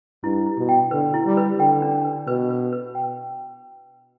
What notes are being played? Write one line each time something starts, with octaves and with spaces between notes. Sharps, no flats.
G2 E4
E4
B2
G5
D3 B4
E4
G3
B4
D3 G5
D4
B4
B2 B4
B4
B4
G5